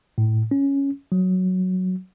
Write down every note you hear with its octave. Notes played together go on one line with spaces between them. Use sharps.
A2
C#4
F#3